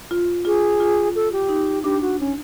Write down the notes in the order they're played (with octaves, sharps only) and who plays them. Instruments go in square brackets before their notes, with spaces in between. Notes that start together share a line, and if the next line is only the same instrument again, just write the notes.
[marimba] F4
[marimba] F4 [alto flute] G#4
[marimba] F4
[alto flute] A4
G4
[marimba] D#4
[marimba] D4 [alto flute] G4
[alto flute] F#4
C#4